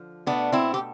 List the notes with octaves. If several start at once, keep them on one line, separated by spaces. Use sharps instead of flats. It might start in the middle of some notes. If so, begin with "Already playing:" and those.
Already playing: D3 F3
B2 A3 B3 D4
C4 E4
G4